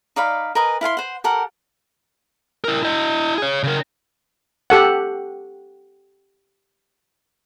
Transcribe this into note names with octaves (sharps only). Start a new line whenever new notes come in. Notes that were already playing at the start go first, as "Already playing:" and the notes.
D#4 D5 F5 B5
A#4 B4 D#5 G#5
E4 F5 G#5 C6
C5 F#5
G4 A4 A#4 F#5
E4 A#4
E4 D#5
G#4 C#5
C#3 A#4
G4 A4 F#5